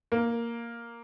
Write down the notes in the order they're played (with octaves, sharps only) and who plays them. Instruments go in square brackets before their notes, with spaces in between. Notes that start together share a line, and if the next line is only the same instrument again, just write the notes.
[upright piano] A#3